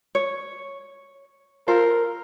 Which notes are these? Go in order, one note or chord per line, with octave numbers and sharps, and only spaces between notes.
C#5
F4 A4 A#4 C5